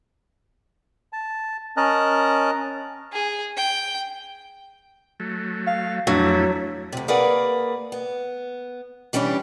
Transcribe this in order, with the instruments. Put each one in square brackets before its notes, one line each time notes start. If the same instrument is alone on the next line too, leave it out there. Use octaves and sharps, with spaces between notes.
[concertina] A5
C#4 A#4 D#5 A5 A#5 F#6
[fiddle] G#4
G5
[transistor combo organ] F#3 A3
[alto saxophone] F5
[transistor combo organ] F2 A3 E4 [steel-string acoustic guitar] F#3 [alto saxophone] D4
[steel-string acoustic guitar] D2 C3
A#3 G#4 A#4 B4 D5 F#5
B3
E3 G3 C#4 D4 G4